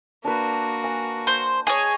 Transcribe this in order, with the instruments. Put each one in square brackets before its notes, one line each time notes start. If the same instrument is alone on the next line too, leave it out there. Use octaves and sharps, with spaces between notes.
[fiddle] A#3 F#4 [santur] D4 B4
[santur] G#5
[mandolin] C5
[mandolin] G#4 C#5 [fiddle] D#5 [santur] D#6